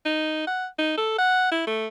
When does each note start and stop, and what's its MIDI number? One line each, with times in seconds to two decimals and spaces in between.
0.05 0.44 63
0.47 0.66 78
0.78 0.95 63
0.97 1.16 69
1.18 1.50 78
1.52 1.65 64
1.67 1.87 57